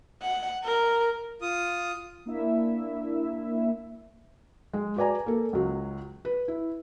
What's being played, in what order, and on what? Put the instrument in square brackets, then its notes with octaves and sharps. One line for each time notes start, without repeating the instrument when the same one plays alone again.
[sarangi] F#5
A#4
[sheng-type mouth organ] F4 D#6
[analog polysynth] A#3 D4 E4 E5
[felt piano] G#3
F#4 B4 D5 G#5 A#5
A#3 A4
C#2 F#3
B4
E4